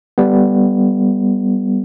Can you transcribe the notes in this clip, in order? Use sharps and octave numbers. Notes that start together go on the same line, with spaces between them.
G3 B3